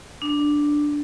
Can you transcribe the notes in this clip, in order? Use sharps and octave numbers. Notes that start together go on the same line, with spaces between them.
D4